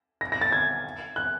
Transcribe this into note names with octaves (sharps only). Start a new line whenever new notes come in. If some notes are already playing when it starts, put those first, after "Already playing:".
A#6
A#6
A6
G#6
F#6